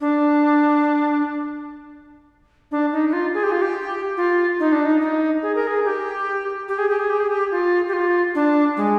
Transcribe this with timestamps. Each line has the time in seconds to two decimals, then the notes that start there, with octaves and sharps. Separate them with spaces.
0.01 D4
2.71 D4
2.93 D#4
3.09 D#4
3.13 F4
3.34 G#4
3.43 G4
3.52 F4
3.62 G4
4.17 F4
4.60 D#4
4.72 D4
4.85 D#4
5.01 D#4
5.43 G#4
5.55 A#4
5.67 G#4
5.85 G4
6.68 G4
6.78 G#4
6.89 G4
6.99 G#4
7.10 G4
7.20 G#4
7.30 G4
7.51 F4
7.88 G4
7.93 F4
8.35 D4
8.77 G#3